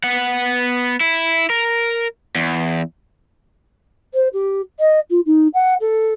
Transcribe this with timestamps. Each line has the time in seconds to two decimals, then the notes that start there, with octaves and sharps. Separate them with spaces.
0.04 B3 F#5
1.00 E4
1.50 A#4
2.35 E2
4.14 C5
4.33 G4
4.80 D#5
5.10 F4
5.26 D#4
5.54 F#5
5.81 A4